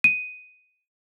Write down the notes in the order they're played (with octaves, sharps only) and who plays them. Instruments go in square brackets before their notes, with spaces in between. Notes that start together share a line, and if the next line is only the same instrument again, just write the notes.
[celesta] D#7